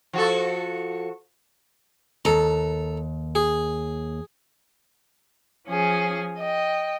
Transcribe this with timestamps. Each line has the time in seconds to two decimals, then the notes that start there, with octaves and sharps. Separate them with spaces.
0.13 F3 F#4 A4
2.25 D#2 A4 A#5
3.35 G#4
5.68 F3 C#4 G#4
6.38 D#5 G5